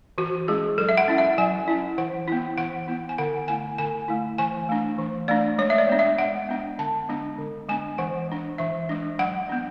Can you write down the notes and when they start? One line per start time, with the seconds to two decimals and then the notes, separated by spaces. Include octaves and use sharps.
0.18 E3 F#4
0.47 G#3 C#4 E4 G#4
0.78 F#3 A4
0.89 E5
0.98 F#5
1.08 C#4 E4
1.18 E5
1.38 F#3 G#5
1.68 C#4 E4
1.98 E3 F#5
2.28 B3 E4
2.58 E3 F#5
2.88 B3 E4
3.09 G#5
3.18 D3 F#5
3.48 A3 E4 G#5
3.78 D3 G#5
4.08 A3 E4
4.38 E3 G#5
4.69 A3 D4
4.99 E3
5.28 A3 D4 D5
5.59 G#3 C#5
5.70 E5
5.78 D5
5.89 B3 D4
5.99 E5
6.19 G#3 F#5
6.49 B3 D4
6.78 D3 A5
7.09 G#3 B3 D4
7.38 D3
7.69 G#3 B3 D4 G#5
7.98 E3 F#5
8.29 G#3 D4
8.58 E3 E5
8.89 G#3 D4
9.19 F#3 F#5
9.50 B3 D4